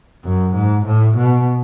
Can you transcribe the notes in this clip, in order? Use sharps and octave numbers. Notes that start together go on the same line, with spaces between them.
F#2
G#2
A2
B2